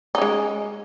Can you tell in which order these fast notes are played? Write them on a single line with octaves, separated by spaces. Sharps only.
D#4 C#4 G#3